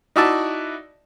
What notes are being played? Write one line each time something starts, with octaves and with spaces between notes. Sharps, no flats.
D#4 E4 F#4 D5 E5 A5